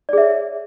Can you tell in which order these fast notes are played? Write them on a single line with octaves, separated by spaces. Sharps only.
D5 G#4 E5 C#5